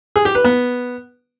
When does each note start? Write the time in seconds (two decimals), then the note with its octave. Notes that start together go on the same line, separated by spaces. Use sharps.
0.16 G#4
0.25 G4
0.35 B4
0.44 B3